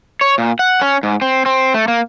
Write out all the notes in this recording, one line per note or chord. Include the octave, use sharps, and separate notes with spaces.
C#5
A#2
F#5
C#4
G#2
C4
C4
A3
A#3